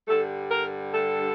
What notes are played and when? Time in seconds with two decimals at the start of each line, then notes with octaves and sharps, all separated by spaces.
0.07 G2 D3 G3 A4
0.50 A#4
0.92 A4